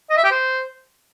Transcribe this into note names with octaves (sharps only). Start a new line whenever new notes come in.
D#5
E5
G4
C5